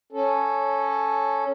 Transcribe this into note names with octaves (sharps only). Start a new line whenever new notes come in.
C#4 A4